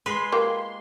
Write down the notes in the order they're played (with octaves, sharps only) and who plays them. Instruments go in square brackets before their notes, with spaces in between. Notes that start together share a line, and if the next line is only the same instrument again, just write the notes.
[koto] G#3 B4 [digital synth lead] C6
[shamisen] A#3 F4 G4